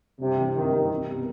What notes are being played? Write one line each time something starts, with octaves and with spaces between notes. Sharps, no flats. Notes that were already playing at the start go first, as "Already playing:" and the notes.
G2 C3
E3 G3 C4
G2 D#3
E3 G3 C4
C2
B2 G3 B3